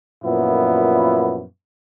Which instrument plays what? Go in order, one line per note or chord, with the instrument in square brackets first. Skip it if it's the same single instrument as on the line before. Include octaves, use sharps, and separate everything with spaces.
[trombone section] F#2 A#2 F3 B3 E4